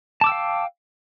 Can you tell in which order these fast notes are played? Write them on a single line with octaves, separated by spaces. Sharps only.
A5 D6 E6 G5 F5